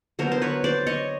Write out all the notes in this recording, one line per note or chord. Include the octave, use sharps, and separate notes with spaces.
D3 F#3 B3 A#4 C5
C5
B4 C#5
C5 D5
C#5 D#5